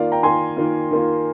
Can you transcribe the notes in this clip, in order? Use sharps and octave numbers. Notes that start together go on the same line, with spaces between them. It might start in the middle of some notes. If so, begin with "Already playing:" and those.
Already playing: D#3 A#3 F4 D5 F5
G5 A#5
D#3 A#3 F4 G#5 C6
D#3 A#3 F4
D#3 A#3 F4